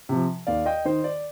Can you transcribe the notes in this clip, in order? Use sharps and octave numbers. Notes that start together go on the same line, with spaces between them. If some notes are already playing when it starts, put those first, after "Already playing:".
C3 F3
D#2 D5 F5
D#5 G5
D#3 C5 D#5
D5